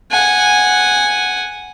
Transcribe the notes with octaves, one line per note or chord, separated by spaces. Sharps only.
F#5 G#5